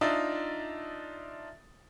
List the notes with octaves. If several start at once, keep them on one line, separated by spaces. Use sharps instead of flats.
D4 D#4 F4 E5